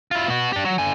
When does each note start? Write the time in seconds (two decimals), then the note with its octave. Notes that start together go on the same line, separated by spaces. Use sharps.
0.11 E4 F4
0.28 B3 F#4
0.53 D4 G4
0.65 F#3
0.78 D3 G#5